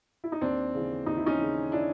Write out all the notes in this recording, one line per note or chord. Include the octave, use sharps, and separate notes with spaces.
E4
D#4
D#2 C4 D4
C#3 E3
D#2 D#4
E4
C#4 D#4
C#3 E3
D4 E4